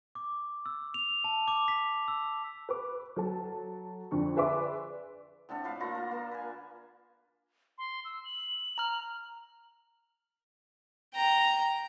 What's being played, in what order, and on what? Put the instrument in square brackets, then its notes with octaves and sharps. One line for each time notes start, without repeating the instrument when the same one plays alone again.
[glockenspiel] D6
E6
F7
A5
D6
B6
E6
[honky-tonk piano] B4 D6
F#3 A4 A5
F2 D3 D4 C#6
G#4 B4 D5 E5 C6 D6
[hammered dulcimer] A2 D3 C4 A4
F4 B4 F5
A#3 F4 B4 A#5
A#4
A#3
B4 G#5
[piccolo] C6
E6
F#7
[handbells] A#5 F6
[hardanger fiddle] G5 A#5